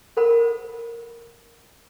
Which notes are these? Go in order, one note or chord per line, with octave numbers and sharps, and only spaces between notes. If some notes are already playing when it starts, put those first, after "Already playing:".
A4 A#4 C5 F#5 B5